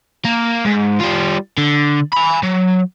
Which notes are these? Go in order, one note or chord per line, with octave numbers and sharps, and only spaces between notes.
A#3
G#2
G3 F4
D3
G#5 B5
F#3